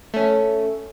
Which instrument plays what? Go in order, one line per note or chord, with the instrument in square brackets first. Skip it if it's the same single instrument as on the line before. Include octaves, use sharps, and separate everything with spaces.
[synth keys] A3 C#4